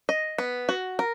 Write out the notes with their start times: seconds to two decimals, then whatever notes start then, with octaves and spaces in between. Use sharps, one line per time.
0.09 D#5
0.38 B3
0.69 F#4
0.99 A#4